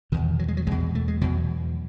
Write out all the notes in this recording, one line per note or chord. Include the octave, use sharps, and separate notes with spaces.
E2 B2 D#3
F#3
G#3
F#3
E2 B2 G#3
A3
G#3
E2 B2 F#3